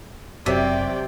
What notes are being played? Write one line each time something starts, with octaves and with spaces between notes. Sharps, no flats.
F#1 C3 F#3 C4 D5 E5 G5